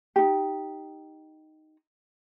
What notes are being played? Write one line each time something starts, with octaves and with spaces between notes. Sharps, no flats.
D#4 G4